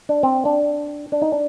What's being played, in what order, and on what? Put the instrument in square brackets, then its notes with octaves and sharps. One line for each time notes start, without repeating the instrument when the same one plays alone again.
[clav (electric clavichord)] D4
C4
D4
D4
D#4
D4